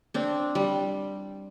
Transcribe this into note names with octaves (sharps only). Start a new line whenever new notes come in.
C4 D4
G3